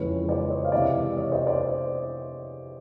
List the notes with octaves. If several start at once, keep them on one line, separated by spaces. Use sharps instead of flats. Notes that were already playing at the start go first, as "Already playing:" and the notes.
Already playing: F2 C#3 E3 G#3 B4 C#5
C5 D5
C#5 D#5
F5
C3 E3 G#3 D5 E5
C#5 D#5
C5 D5
C5 D5